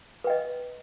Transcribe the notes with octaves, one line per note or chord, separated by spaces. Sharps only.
B4 D#5 G5